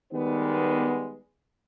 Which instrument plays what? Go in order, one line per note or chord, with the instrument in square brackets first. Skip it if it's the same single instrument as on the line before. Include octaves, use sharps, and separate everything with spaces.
[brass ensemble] D#3 G3 G#3 B3